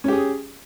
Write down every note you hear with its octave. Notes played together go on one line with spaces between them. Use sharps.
C#4 G4 G#4